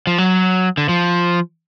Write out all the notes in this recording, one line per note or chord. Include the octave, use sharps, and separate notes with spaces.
F3
F#3
D3
F3